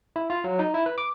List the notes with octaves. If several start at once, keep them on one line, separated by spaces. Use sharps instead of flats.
E4
F4
F#3
D#4
E4
B4
D6